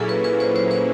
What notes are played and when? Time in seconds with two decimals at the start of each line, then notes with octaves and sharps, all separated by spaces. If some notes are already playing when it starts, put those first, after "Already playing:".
Already playing: A#2 F#3 A#3 C#4 E4 G#4 A4
0.09 B4
0.24 B4
0.40 C5
0.56 C5
0.71 C5